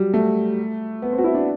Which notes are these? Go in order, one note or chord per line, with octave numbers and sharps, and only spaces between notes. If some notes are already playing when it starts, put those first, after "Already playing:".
Already playing: F#3 G3
A3
B3
C4
F#4
E4
D4